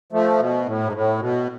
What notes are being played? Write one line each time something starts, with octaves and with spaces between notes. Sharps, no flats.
F3 A3
B2
A2
G#2
A2
B2